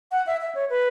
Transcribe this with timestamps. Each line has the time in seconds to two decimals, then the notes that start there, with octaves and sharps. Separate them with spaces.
0.12 F#5
0.27 E5
0.41 E5
0.55 C#5
0.70 B4